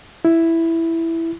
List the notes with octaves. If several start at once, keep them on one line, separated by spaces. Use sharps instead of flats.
E4